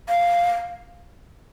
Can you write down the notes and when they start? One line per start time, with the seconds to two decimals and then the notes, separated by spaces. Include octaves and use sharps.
0.09 F5